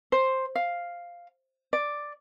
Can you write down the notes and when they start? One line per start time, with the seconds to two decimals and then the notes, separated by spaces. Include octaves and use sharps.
0.12 C5
0.55 F5
1.73 D5